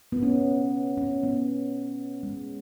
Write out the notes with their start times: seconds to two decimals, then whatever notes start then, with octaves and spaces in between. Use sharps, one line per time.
0.12 B3
0.23 C#4
0.97 C#4
1.23 B3
2.23 G#3